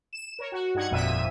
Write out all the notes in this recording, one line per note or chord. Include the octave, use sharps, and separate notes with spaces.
E7
A#4 C#5
F#4
G2 D#4 F#5 G#6
G1 F2 A#2 E5 D#7